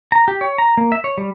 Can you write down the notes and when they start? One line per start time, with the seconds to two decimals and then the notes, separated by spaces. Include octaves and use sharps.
0.12 A#5
0.28 G4
0.41 C#5
0.58 A#5
0.77 A#3
0.92 E5
1.04 C#5
1.18 G3